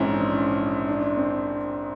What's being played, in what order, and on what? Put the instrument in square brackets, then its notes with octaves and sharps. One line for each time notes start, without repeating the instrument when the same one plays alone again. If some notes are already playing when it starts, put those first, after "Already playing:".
Already playing: [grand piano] A#1 G#2 E3 G#3 [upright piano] C4 C#4
[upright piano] D4
C#4
D4
C4